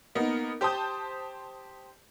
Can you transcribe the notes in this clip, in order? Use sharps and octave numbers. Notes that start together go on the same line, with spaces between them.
A#3 B3 D#4 A#4
G4 C5 A5 D#6 G6